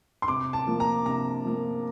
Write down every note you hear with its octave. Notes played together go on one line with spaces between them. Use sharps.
C6
C3 D6
A5
F3 A#3
A#5
C3 A#5
F3 A#3